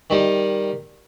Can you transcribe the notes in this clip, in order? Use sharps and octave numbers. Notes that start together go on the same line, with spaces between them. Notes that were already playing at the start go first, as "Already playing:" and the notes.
D#3 G3